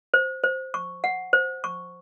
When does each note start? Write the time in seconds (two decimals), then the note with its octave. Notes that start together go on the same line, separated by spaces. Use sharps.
0.14 C5
0.44 C5
0.74 C#6
1.04 F#5
1.33 C5
1.64 C#6